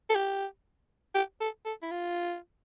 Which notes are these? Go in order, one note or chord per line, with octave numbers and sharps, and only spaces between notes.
A4
G4
G4
A4
A4
E4
F4